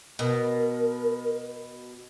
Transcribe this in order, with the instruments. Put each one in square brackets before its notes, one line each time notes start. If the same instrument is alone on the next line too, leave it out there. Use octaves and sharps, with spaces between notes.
[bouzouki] B2 [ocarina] A#4